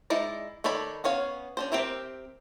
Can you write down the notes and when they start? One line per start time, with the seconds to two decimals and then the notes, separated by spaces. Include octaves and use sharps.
0.10 G#3 D#4 E4 D5
0.64 D#3 A4 C#5 D5 B5
1.04 B3 C#4 C#5 F5
1.57 C#4 D4 C5
1.72 C4 G4 A#4 C5 E5